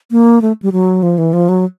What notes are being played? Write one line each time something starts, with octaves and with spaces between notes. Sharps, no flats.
A#3
A3
G3
F#3
F3
E3
F3
F#3